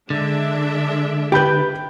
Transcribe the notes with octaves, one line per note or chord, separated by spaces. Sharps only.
D3 G#3 D4 E5
G4 B4 G5 B5 G6